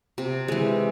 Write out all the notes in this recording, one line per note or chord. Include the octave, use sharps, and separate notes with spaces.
C3
E3 G#3